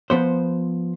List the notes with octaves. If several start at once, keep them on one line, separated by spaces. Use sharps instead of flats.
F3 B3 C5